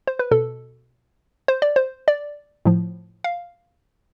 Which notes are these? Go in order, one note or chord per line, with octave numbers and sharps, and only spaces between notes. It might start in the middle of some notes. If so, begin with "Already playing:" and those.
C5
B4
B2 A4
C5
D5
C5
D5
A2 F3
F5